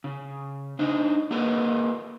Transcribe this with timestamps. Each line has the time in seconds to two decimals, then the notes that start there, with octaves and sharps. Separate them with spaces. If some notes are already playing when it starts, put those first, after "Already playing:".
0.04 C#3
0.79 D4 D#4 C5 D#5
1.31 A#3 F#4 G#4 A#4 B4 D#5